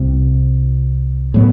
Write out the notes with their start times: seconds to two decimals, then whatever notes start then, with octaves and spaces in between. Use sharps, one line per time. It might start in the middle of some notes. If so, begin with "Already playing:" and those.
Already playing: C2 C3 G3
1.34 A2 F#3 B3